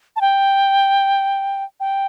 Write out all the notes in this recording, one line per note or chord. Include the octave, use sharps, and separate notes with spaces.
A5
G5
G5